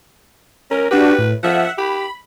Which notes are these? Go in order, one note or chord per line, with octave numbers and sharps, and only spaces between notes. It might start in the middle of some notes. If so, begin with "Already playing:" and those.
C#4 A#4
D4 F#4 G4 B4
A2
F3 E5 F#5
G4 B5